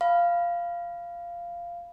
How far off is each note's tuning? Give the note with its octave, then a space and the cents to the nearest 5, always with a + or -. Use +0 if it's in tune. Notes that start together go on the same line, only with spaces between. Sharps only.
F5 -10 B5 +0